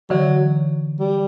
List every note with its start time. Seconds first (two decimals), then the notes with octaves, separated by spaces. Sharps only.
0.10 D3 E3 F#3
1.00 G3